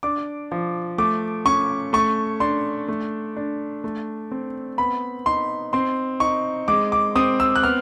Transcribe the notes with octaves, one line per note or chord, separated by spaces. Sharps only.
D4 D6
F3
A3 D6
C#4 C#6
A3 C#6
D4 C6
A3
D4
A3
C4
B3 B5
D#4 C6
C4 C6
D#4 C#6
G#3 D6
D6
C4 D#6
E6
F#6
B3 F6